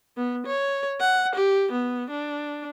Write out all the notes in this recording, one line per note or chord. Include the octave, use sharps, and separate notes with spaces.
B3
C#5
F#5
G4
B3
D4